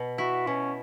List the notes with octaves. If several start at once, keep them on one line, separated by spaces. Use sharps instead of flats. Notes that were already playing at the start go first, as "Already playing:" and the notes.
Already playing: B2
E4 F#4
B2 C#4